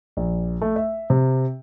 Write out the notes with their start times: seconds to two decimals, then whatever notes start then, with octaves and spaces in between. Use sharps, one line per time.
0.17 A#1
0.61 A3
0.76 E5
1.10 C3